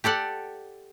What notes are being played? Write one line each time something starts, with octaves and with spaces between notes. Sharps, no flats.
G4 A4 D5 F#5